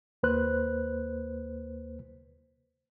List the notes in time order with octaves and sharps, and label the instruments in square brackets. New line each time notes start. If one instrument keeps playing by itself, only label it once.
[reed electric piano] D#2 A#3 B4 C5 F#6